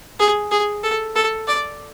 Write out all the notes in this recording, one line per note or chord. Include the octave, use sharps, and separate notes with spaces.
G#4
G#4
A4
A4
D5